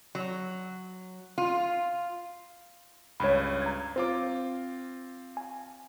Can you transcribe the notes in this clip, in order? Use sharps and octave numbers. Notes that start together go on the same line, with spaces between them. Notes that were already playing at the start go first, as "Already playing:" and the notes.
F#3
F4
C#2 G2 C#5 B5
A#5 G#6
C4 F4 C5 D6
G#5